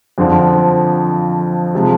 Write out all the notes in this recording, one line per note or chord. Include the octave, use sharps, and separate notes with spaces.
F2 D3 F3 C4
C3 F3 G#3